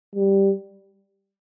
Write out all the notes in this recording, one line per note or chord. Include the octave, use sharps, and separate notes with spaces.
G3